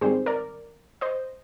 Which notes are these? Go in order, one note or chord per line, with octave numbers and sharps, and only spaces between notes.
G#2 D#3 G3 C4 G#4 C5
A#4 D5
C5 D#5